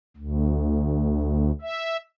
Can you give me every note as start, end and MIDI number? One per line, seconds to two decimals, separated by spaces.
0.17 1.51 38
1.61 1.97 76